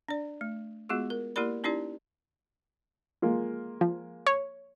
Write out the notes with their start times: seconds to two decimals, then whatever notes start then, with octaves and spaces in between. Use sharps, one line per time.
0.08 D4 D5
0.41 A3
0.89 G#3 B3 F4 F#4 G#4
1.10 A#4
1.36 A#3 E4 G4 A#4 D5 B5
1.64 C#4 D#4 E4 G4 D5
3.22 G#3 A#3 F4
3.81 F3
4.27 C#5